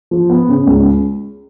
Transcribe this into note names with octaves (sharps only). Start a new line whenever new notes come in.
F3
B3
C#3
C#2